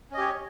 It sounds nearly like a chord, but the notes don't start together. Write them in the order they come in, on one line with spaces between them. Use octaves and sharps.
C#4 D#5 G4 C#5